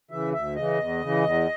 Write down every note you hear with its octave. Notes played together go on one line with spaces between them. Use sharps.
C#3 E3 E5
D2 E5
C#3 E3 D#5
E2
C#3 E3
E2